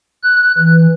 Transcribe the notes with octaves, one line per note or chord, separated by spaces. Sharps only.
F#6
E3